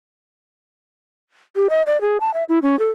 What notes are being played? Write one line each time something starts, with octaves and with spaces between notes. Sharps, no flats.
G4
D#5
D5
G#4
A5
E5
E4
C#4
A4